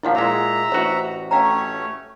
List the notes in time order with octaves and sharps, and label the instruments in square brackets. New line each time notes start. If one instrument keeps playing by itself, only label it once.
[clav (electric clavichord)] D#2 A#2 F3 [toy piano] E4 F5 F#5
[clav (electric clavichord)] A#2 G#3 [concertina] E5 A#5
[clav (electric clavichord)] A1 F#4 [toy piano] F4 C5
[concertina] A3 C#4 C#5 [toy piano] F5 G5 A#5